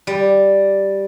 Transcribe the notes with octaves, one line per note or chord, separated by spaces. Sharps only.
G3